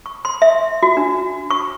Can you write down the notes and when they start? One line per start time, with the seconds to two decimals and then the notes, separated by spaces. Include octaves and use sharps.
0.06 C#6
0.25 C6
0.42 E5
0.83 F#4
0.97 D4
1.51 C#6